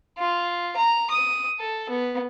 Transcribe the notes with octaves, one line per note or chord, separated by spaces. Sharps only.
F4
A#5
D#6
A4
B3